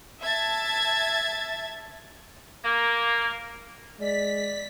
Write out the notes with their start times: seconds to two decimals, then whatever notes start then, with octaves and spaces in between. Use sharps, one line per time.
0.22 E5 A5 G#6 A6
2.63 A#3
4.00 G#3 D5 B6